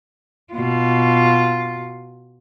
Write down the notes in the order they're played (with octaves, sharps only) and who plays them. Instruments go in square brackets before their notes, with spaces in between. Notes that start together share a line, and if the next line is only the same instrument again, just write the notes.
[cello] B2 F4